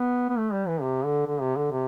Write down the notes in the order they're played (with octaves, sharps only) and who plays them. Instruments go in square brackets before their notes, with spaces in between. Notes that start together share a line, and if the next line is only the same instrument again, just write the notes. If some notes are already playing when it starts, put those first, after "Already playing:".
Already playing: [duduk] B3
B3
A3
G3
E3
C3
D3
D3
C3
D3
C3